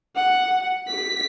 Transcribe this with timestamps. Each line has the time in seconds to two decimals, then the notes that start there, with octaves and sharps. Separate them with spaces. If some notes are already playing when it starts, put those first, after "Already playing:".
0.16 F#5
0.88 B6